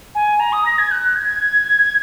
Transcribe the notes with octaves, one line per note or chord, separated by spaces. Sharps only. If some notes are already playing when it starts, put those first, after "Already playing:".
G#5
A#5
D#6
A#6
G#6
F#6
G#6